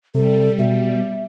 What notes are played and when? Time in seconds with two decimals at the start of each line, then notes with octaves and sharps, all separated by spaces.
0.15 C3 G3 A4
0.59 B2 E5